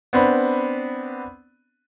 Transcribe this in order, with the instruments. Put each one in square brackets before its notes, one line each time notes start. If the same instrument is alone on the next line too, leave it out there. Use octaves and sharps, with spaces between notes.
[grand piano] B3 C4 D4 B5